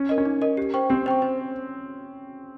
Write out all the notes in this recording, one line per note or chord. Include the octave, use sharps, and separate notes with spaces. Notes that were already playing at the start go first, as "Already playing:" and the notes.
Already playing: C#4
A#4 D#5
C#4
D#4
A#4 D#5
G4
C5 G5 C#6
C4 G4
C5 G5 C#6
C5